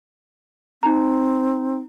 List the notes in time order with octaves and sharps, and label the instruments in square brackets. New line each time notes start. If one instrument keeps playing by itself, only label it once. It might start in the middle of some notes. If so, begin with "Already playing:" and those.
[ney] C4 [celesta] D#4 A#5